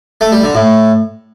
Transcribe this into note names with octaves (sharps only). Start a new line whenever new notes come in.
A3
G3
D3
A2